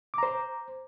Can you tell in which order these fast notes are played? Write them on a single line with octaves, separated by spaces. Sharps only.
D6 A#5 C5